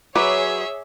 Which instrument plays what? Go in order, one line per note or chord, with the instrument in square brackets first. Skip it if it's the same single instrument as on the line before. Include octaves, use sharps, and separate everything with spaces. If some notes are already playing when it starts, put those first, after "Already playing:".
[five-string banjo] F#3 B4 [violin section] G#4 C#5 [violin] E5 [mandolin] D6